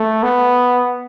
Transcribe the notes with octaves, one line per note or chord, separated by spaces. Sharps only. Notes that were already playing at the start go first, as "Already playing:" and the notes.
Already playing: A3
B3